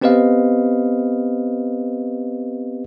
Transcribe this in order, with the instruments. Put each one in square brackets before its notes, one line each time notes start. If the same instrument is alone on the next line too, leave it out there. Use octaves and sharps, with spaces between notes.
[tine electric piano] B3 C4 G4 B4 D#5 F5